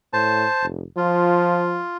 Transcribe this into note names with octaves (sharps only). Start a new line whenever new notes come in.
A2 C5 A5
F1
F3 F4